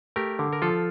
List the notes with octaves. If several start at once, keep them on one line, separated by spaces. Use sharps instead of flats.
A3 G4 A#4
D3
A#4
F3 F4 A4